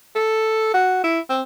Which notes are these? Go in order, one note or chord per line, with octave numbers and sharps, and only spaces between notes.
A4
F#4
E4
C4